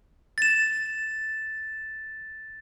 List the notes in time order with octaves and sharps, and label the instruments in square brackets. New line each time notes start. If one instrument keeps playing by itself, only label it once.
[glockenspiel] A6 E7